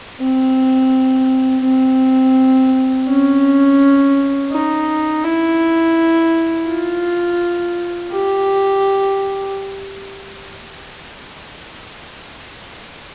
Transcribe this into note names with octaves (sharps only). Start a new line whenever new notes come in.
C4
C4
C#4
D#4
E4
F4
G4